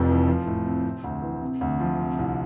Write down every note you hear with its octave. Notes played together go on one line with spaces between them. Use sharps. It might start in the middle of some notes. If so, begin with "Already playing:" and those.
Already playing: F1 F2 F3
E3
F3
A2
C4
C3
D2
E3
C3
D2
F3
C3
C2